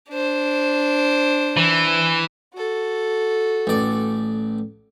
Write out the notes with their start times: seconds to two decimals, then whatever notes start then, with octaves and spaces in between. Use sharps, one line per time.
0.12 D4 C5
1.57 E3
2.54 F#4 A4
3.67 A1 D5